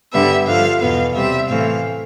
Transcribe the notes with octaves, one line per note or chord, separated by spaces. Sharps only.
G2 D3 G3 B3 E5
G2 D3 F3 F5
E2 B2 B3 F5
C3 G3 C4 E5
A2 E3 A3 C4 F5